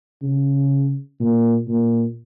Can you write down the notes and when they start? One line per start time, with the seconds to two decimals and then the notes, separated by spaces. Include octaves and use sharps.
0.22 C#3
1.20 A#2
1.68 A#2